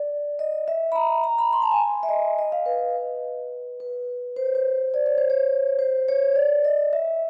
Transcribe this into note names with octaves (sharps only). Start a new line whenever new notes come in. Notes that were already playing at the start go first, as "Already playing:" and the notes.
Already playing: D5
D#5
E5
B5
A#5
A#5
B5
C6
A5
G#5
E5
D#5
D#5
F5
B4
B4
C5
C#5
C5
D5
C#5
C5
C#5
C5
C#5
D5
D#5
E5